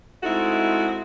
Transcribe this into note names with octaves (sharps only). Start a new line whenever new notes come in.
G#3 A3 C4 D#4 E4 F#4